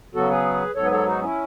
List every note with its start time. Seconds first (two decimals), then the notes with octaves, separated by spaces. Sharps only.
0.15 C#3 F#3 B3 F#4 A4
0.30 G#4 B4
0.76 G#2 F#3 B3 A4 C#5
0.85 B4
0.91 A4 C#5
1.06 D#4 F#4
1.21 C#4 E4